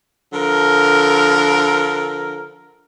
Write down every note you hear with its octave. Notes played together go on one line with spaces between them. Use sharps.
D3 F3 A#4